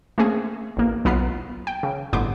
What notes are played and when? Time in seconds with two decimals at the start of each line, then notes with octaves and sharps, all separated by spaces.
0.18 A3 A#3 C4 C#4 G#4
0.77 A1 A#3
1.05 B1 B3 F4 A#5 C7
1.67 G5
1.83 C#3
2.13 G1 A2 B3 C6 D6 G6